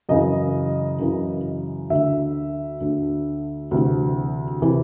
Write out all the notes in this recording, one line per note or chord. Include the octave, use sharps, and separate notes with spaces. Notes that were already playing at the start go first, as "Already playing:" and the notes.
F#2 C#3 E3 D#5
F#2 C#3 E3
D2 D3 E5
D2 D3
D2 C3 E3
C3 E3